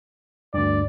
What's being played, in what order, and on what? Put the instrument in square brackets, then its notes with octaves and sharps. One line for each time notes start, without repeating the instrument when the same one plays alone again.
[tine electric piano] D2 G2 [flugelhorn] D5